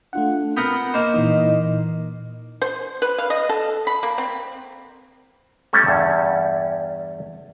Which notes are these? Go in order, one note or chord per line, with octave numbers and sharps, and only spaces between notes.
A3 D4 F4 F#5
B3 C4 A#4 F#5 G6
A#3 C5 D#5
A#2 E3 D#4
C5
B4
F5
D#5
A4
B5
A#3
C4
G3 A3 C#4 A4
E2 G2